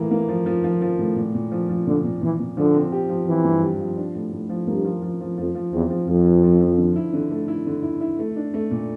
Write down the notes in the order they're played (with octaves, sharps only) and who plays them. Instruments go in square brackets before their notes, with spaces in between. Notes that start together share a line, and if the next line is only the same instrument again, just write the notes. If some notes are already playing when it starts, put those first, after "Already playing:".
Already playing: [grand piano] A2 A#3 [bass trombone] E3
[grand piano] A#3
F3
F3
F3
F3
A2
A#2
A#2
F3
F3
[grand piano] A#2 [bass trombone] D3
[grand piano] A#2
[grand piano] A#2 [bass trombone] E3
[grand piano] A#2
[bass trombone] D3 [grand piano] F3
[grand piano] C4
G4
F3
[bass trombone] E3 [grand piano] C4
[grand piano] G2
G4
F3
D4
A2
A2
F3
[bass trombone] G2 [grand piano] A#3
[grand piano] F3
F3
F3
[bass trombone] F2 [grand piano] F3
[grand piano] F3
[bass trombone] E2 [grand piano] C4
[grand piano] F3
[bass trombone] F2 [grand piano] F3
[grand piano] F3
F3
F3
D3
E4
D3
A3
E4
D3
E4
E4
A3
D4
A3
A#2